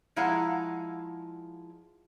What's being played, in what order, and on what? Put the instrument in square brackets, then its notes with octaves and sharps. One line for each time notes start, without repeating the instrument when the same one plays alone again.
[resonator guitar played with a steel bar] F3 G#3 E4 F5 F#5 A#5